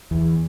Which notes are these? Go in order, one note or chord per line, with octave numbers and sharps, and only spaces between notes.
E2 E3